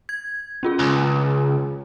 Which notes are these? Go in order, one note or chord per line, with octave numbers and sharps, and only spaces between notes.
G#6
C#4 F4 G#4
C#2